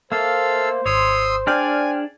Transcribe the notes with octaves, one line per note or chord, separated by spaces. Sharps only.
A#3 A4 C5 E5 F5 E6
G#1 C#5 C6 D#6 E6
D4 G#4 D5 G5 G#5 F6